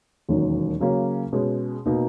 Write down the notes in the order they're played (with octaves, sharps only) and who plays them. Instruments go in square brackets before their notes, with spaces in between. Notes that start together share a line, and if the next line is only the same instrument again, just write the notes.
[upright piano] E1 D#2 D#3 F#3 C#4
C#3 F#3 A#3 C#4 F#4
B2 G#3 C#4
B2 A#3 D#4